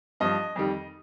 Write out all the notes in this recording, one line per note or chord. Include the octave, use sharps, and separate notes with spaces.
G2 F3 D#5
F2 D#3 G3